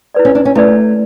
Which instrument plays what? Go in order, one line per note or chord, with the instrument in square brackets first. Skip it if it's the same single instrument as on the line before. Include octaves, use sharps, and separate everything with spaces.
[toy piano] E4 B4 D5
[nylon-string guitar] C#4
D4
C#4
[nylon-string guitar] A3 [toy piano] E4 B4 D5